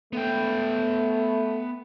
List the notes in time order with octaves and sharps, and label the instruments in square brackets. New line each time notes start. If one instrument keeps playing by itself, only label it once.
[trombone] A3 [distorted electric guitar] B3 G5